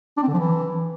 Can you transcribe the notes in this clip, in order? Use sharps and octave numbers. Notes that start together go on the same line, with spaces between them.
D4
C4
D3
F3
E3